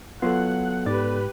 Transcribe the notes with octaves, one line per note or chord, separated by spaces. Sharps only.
F#3 B3 F4 A4 F#5
G#2 G4 B4 D5